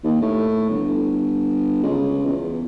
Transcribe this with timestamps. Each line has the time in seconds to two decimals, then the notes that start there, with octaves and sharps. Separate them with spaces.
0.04 D#2
0.22 A2
0.69 G1
1.83 C#2
2.26 E2